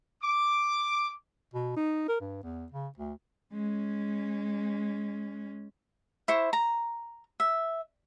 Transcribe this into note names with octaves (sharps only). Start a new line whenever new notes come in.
D6
B2
D#4
A#4
G2
E2
C#3
D2
G#3 C#4
E4 C5 C#6
A#5
E5